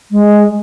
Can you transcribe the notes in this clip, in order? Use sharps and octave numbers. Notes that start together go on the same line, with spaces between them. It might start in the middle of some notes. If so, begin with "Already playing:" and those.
G#3